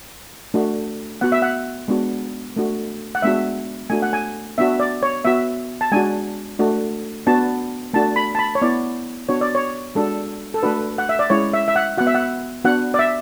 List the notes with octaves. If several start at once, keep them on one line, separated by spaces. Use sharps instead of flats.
A3 D4 F#4
B3 F#4 F#5
E5
F#5
G#3 B3 D4 F#4
A3 D4 F#4
F#5
G#3 B3 D4 F#4 E5
A3 D4 F#4 G#5
F#5
G#5
B3 D4 F#4 E5
D5
C#5
B3 F#4 E5
A5
G#3 D4 F#4 G#5
A3 D4 F#4
B3 D4 F#4 A5
A3 D4 F#4 A5
B5
A5
B5
C#5
B3 E4 D5
B3 D4 F#4 C#5
D5
C#5
G#3 D4 F#4 A4
A4
A3 D4 F#4 B4
F#5
E5
D5
G#3 C#4 E4 C#5
E5
E5
F#5
B3 F#4 F#5
E5
F#5
B3 D4 F#4 F#5
D5
E5